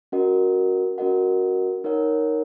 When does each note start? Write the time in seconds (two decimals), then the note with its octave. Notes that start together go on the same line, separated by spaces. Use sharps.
0.12 C#4 F#4 A#4 D#5 F#5
0.98 C#4 F#4 A#4 D#5 F#5
1.84 D#4 A#4 C#5 F#5